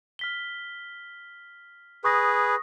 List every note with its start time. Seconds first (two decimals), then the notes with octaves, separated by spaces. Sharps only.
0.19 F6 B6 G7
2.04 G#4 B4 C#6 D#6 A#6